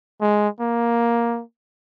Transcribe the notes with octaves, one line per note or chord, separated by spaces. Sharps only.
G#3
A#3